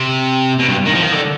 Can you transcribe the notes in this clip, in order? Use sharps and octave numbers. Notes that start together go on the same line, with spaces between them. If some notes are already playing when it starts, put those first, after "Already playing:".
Already playing: C3
B2
G2
D#3
F3
D#3
D3